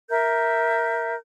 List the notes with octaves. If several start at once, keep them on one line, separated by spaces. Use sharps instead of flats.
A#4 E5 G6